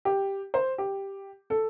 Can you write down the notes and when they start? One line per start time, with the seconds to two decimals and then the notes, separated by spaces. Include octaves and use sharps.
0.05 G4
0.54 C5
0.78 G4
1.50 A4